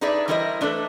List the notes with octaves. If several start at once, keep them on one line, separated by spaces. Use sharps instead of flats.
D4 D#4 G#4 B4 D5 E5
E3 G3 E4 A#4 C5 D#5
A3 D4 A4 B4